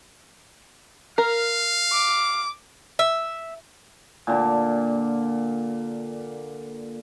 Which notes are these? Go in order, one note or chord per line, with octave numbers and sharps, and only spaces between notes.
A#4 F5
D6
E5
A#2 D3